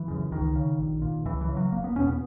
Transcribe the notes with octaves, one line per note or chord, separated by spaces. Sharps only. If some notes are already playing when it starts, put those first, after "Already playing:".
Already playing: E3
F#2 C#3
C#2 D#3
C#3
A#1
A#2
C#2 E3
E3
C#3
F#3
F#1 A#3
B3
E2 B2 C#4
B3